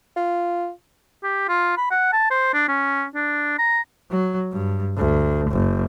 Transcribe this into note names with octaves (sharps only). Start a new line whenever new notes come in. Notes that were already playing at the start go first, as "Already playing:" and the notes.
F4
G4
F4
B5
F#5
A5
C5
D4
C#4
D4
A#5
F#3
G2
D2
F#1